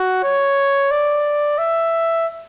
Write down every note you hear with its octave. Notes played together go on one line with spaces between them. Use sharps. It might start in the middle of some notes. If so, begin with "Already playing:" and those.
Already playing: F#4
C#5
D5
E5